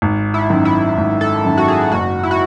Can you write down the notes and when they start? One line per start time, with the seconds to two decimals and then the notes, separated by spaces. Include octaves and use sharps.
0.02 G#1
0.34 E4
0.50 F#2 D#3
0.65 E4
0.98 G#1
1.21 A4
1.45 F#2 D#3
1.58 F#4
1.68 G#4
1.92 F#1 F#4
2.23 E4
2.31 F#4